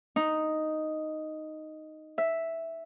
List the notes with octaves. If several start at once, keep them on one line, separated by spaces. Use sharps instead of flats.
D#4
E5